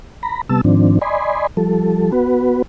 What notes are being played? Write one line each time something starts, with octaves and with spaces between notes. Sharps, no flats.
A#5 B5
C3 G3 B3 A5 E6
G#2 D#3 F3 C4 D4
D5 D#5 G#5 B5 C6
F3 G3 A4
B3 F#4 B4